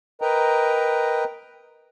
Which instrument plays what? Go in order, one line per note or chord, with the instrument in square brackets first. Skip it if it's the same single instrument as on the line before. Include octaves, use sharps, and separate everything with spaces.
[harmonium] A#4 B4 D#5 G5 A#5